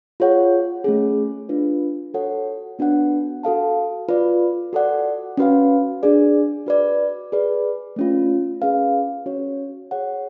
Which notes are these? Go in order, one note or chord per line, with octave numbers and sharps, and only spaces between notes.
F4 G#4 C#5 F#5
A3 C#4 G#4
D4 F4 B4
F#4 A4 C#5 F#5
B3 D4 F#4 B4 F#5
F#4 A4 F5 A5
F4 B4 D5
F#4 A4 D5 F#5
C#4 F#4 B4 F5
D4 G#4 D5
F#4 B4 D5
G#4 B4 D5
A3 C#4 F4
C#4 G#4 B4 F5
C#4 F#4 C#5
G#4 C#5 F#5